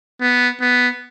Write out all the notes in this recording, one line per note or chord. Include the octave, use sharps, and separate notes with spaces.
B3
B3